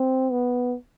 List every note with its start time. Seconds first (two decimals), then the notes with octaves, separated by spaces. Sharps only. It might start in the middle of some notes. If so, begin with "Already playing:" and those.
Already playing: C4
0.32 B3